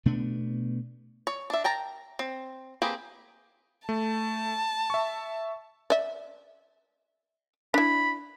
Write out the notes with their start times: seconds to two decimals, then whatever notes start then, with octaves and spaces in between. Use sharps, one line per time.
0.06 B2 A3 B3 D4
1.27 C#5
1.50 D4 E5
1.64 A#4 G5 A5 A#5
2.19 C4
2.82 A#3 C4 G4 G#4 B4
3.89 A3 A5
4.90 E5 C#6
5.90 D5 E5
7.74 D4 E4 B5